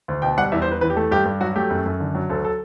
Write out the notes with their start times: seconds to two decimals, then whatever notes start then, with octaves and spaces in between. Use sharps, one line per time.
0.08 D2
0.22 B2 G5
0.37 G3 F#5
0.52 E2 E5
0.62 C5
0.67 E2 B4
0.81 E3 B4
0.90 G4
0.96 A3 A4
1.11 G2 G4
1.25 G2
1.41 F#3 F#4
1.55 A3 G4
1.70 F#2
1.86 F#2
2.00 D3
2.15 F#3
2.30 D2 A4
2.44 A4